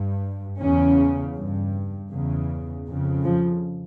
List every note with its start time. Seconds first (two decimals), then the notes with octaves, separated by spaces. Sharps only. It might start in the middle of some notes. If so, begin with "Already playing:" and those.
Already playing: G2
0.60 E2 C#3 C#4
1.36 G2
2.11 E2 C#3
2.87 F2 C#3
3.24 F3